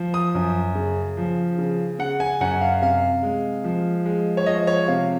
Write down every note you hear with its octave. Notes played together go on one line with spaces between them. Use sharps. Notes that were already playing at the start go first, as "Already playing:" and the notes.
Already playing: F3
D#6
F#2
C#3
F3
C#3
C#3 F#5
G#5
F#2 F#5
F5
C3 F5
G#3
F3
G#3
C#5
F3 D#5
C#5
C3 F5